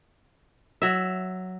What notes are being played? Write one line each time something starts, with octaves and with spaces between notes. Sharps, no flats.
F#3 E5